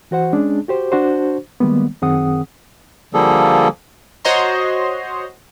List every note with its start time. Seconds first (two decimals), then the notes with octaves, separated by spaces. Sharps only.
0.11 E3 F#4 C5 F#5
0.33 G#3 C#4 D4 G#4
0.68 F#4 G4 C5
0.92 D4 F#4 C5
1.60 D#3 G3 G#3 A#3 B3
2.02 F#2 D#3 C4 G#4 F#5 D#6
3.14 D3 F3 G3 A#3 G#4 A4
4.25 F#4 C5 C#5 D#5 A#5 C6